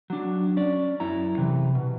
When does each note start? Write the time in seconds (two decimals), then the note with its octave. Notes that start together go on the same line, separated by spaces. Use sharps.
0.10 F#3 D4
0.57 C#4 D5
1.00 F#2 E4 A#5
1.38 C3 E3
1.75 B2